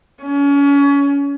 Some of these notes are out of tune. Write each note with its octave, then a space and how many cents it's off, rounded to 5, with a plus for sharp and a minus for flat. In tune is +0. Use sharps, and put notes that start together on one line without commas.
C#4 +30